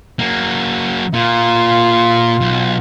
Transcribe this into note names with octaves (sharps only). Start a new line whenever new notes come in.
F#3 A#3
A#2 F4
B1